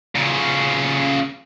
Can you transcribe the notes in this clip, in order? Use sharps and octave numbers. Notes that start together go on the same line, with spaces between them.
A#2 C#3